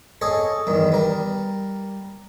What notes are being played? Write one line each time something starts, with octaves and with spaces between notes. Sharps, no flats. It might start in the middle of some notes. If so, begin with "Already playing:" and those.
G#4 A4 C#5 D#5
E2 G2 D#3
G3 A#4